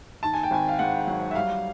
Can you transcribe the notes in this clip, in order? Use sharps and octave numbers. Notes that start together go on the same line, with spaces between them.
D#3 A5
G#5
G5
G#1 G#5
F5
G#2 F#5
F#3
E5
G3 F5